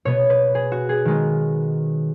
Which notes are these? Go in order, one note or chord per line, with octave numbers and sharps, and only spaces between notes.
B2 B3 C#5
B4
G#4
F#4
G#4
D#3 G#3 B3